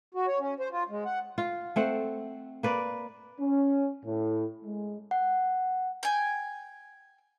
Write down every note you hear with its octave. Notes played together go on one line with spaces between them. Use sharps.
F#4
C#5
C#4
C5
F4
G#3
F#5
F4
A3 C4 F#5
A#3 B4 D5
C#4
A2
G#3
F#5
G5 G#5